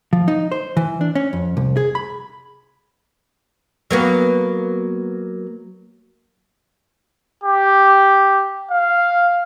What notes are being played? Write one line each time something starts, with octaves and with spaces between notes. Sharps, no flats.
F3
D#4
C5
E3
D4
C#4
F2
C2
G#4
B5
F#3 A#3 B3
G4
F5